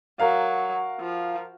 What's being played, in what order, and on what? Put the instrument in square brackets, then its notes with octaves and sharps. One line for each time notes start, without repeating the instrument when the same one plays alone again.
[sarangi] F#3 [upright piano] A#4 F5
[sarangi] F3